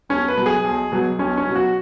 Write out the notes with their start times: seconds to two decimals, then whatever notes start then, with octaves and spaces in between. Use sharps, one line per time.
0.09 B1 C#4
0.28 B4
0.37 B2 F#3
0.46 G#4
0.64 B1
0.92 B2 F#3
1.19 B1 C#4
1.37 C#4
1.47 B2 F#3
1.55 F#4